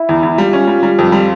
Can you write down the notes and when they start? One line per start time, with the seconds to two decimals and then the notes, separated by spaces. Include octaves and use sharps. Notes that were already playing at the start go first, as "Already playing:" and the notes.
Already playing: E4
0.09 E2
0.23 E2
0.38 G3 F4
0.53 C#4
0.68 G3
0.83 G3
0.99 F2
1.12 G3